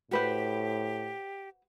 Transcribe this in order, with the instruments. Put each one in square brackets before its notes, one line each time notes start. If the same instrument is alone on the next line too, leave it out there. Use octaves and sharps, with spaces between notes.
[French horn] A2 [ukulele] F#4 B4 C5 [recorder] G4